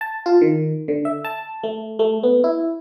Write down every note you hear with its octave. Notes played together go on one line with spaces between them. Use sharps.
A5
F4
D#3
D3
E5
A5
A3
A3
B3
E4